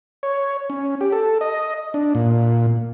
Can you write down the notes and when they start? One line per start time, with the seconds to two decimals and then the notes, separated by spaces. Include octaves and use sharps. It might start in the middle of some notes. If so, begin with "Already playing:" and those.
0.23 C#5
0.70 C#4
1.01 G4
1.12 A4
1.41 D#5
1.94 D4
2.15 A#2